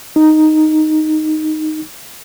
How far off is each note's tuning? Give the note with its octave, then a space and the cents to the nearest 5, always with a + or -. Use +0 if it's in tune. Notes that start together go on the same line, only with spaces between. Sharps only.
D#4 -5